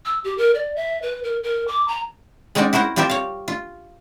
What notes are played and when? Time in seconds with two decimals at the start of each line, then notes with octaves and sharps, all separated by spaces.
0.05 E6
0.24 G4
0.38 A#4
0.55 D5
0.76 E5
1.02 B4
1.24 A#4
1.44 A#4
1.68 D6
1.88 A#5
2.55 G#3 C4 C#4 D#4 F#4 D5
2.73 E4 F#4 A#4 C5 F#5
2.96 G3 C4 F4 G4 A#4 E5
3.10 C#5 F5
3.48 F4